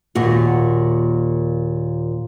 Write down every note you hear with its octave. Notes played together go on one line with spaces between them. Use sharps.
D#2 A#2 F#4